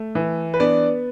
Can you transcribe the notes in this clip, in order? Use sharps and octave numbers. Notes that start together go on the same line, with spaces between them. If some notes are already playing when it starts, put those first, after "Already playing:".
Already playing: A3
E3
B4
B3 D4 D5